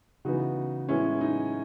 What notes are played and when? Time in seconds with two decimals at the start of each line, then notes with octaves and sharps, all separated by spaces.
0.25 C#3 E3 B3 D#4 F#4
0.89 A2 E3 G#3 B3 C#4 E4
1.21 D#4